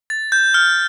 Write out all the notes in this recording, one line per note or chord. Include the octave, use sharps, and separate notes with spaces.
A6
G6
F6